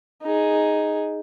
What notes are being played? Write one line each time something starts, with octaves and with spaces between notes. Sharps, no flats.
D#4 G#4